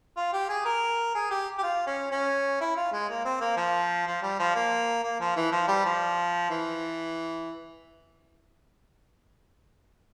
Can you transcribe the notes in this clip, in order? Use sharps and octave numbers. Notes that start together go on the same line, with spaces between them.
F4
G4
G#4
A#4
G#4
G4
G4
F4
C#4
C#4
E4
F4
G#3
A#3
C4
A#3
F3
F3
G3
F3
A#3
A#3
F3
E3
F3
G3
F3
E3